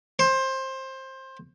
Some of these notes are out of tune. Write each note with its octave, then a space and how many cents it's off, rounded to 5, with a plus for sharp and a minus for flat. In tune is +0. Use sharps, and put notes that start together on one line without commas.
C5 +20